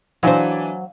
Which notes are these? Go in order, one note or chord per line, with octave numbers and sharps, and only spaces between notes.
E3 F#3 D4 C5 D5 F5 G#5